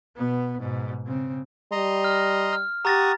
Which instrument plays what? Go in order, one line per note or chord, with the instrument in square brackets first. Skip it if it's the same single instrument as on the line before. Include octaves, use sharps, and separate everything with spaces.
[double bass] B2 B3
G#2 B2
C#3 C4
[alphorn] G3 [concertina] D#5 A#5 C6
[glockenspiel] F6
F6
[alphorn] G4 [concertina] F#5 C#6 D#6 [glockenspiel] A#5 A6 A#6